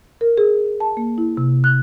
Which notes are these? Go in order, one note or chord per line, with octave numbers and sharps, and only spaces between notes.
A#4
G#4
A5
A#3
E4
C3
F#6